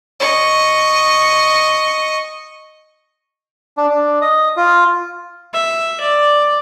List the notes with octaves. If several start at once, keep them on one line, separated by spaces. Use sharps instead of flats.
D#5 C#6
D4
D4
D#5
F4
E5
D5